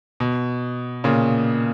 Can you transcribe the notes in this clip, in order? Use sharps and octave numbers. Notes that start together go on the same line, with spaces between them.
B2
A#2 C#3